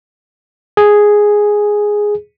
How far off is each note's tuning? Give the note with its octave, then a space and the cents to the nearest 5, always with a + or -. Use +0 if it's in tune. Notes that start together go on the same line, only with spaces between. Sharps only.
G#4 +0